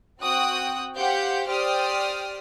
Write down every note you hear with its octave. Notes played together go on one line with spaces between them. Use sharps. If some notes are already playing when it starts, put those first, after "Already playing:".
C4 F#4 G5 D#6 F#6
G4 C5 F5 F#5 G6
G4 C5 D5 G5 D#6 F6